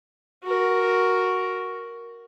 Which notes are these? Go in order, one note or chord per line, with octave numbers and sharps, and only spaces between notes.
F#4 A#4